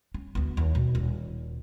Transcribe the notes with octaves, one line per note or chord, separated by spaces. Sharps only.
C#4
D2 B3
D#2
B2
D#1